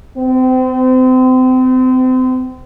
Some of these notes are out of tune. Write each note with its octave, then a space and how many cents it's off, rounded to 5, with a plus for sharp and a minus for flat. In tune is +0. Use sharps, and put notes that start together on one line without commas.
C4 -35